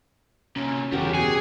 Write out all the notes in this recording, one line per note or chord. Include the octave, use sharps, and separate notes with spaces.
C3 A#3 C#4
G1 E2 C#3 G3 C#4 F#4 G4 A#4
B2 G#4 G#5 C#7